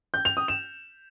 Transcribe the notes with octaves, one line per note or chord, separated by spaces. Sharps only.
G6
F7
D#6
E7